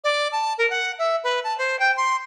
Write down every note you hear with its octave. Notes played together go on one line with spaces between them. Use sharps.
D5
A5
A#4
F#5
E5
B4
A5
C5
G5
C6